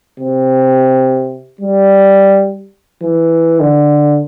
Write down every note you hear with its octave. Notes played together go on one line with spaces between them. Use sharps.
C3
G3
E3
D3